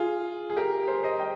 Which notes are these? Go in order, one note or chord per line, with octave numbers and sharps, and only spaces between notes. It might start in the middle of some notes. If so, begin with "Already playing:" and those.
Already playing: F4 G#4
G#4
G4 A#4
G#4 C5
C5 D#5
D#5 G5